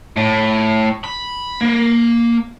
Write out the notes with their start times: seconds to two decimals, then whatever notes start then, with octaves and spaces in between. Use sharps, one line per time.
0.17 A2
1.04 B5
1.61 A#3